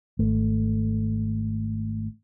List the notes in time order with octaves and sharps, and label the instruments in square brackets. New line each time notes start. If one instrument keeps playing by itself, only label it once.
[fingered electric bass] G#1 A3